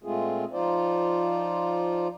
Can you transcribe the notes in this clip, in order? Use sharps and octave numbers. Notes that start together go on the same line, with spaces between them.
A#2 G#3 A3 C4 F4 G#4
F3 D#4 F4 C5 D5